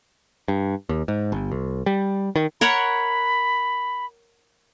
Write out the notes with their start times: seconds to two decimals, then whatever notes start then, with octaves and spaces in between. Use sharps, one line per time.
0.48 G2
0.89 D#2
1.08 G#2
1.32 G1
1.52 C2
1.86 G3
2.36 D#3
2.61 A#4 C#5 F#5 B5